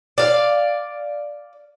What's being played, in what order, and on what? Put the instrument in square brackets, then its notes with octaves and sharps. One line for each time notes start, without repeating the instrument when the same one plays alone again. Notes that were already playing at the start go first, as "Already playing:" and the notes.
[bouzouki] D5 F5